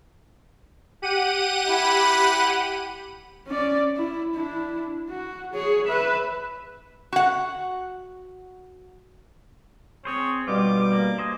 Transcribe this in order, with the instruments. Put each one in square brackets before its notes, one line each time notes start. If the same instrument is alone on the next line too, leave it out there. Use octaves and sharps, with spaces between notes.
[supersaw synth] G4 F#5 D#7
[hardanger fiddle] E4 B5
[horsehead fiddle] C#4 D5
E4
D4 E4
F#4
G#4 C#5
B4 E5
[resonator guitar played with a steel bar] F#4 F#5
[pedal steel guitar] C4 G#4 C5 [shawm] C#5
[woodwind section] G2 B2 G3 [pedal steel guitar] F4 G4 [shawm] D6
[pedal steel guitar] A#3
C5 D#5 G#5